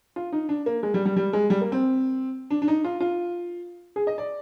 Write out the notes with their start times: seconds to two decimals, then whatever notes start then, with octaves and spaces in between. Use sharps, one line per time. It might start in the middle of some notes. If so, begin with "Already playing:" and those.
0.16 F4
0.33 D#4
0.49 D4
0.66 A#3
0.83 G#3
0.94 G3
1.05 G3
1.16 G3
1.33 G#3
1.50 G3
1.61 A#3
1.72 C4
2.50 D4
2.62 D4
2.68 D#4
2.84 F4
3.00 F4
3.96 G#4
4.07 D#5
4.18 D5